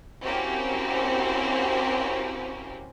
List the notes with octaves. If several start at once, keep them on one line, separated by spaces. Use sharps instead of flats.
A#3 C4 C#4 E4 F#4 G4